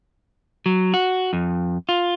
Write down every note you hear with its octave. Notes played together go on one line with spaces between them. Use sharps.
F#3
F#4
F2
F4